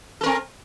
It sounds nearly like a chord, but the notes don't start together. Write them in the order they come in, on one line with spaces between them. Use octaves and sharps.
A4 A#4 C4